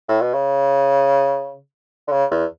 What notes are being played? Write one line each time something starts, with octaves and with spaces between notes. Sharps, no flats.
A2
B2
C#3
D3
C#3
E2